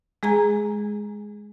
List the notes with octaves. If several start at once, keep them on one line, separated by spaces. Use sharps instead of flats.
G#3 G#4 G#5 A#5